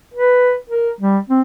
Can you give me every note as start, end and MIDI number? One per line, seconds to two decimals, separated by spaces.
0.14 0.55 71
0.69 0.90 70
1.01 1.18 55
1.29 1.41 60